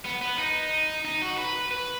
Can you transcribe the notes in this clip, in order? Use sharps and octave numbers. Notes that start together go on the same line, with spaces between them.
B3
B3
D#4
D#4
F#4
B4
B4